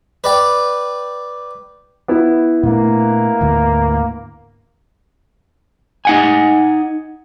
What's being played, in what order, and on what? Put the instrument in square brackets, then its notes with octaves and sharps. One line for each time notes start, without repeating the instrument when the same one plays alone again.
[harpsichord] B4 D5 G5
[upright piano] B3 E4
[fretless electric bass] A#2 A3 D4 [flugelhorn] A#3
[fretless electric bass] D2 G#2 D3
[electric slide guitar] D#4 F#5 G#5